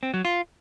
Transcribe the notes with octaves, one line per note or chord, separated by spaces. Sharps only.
C4
F#3
F4